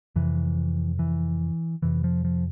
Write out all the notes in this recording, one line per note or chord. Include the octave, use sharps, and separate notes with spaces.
F2 C3 E3
E3
F2 C3 E3
F3
F3